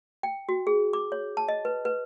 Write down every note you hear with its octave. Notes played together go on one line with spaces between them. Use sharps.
G5
F#4
G#4
D6
C#5
A5
D#5
B4
B4